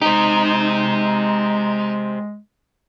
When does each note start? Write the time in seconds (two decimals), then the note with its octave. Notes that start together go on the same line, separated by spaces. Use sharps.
0.02 G#3 D#4 G4 C5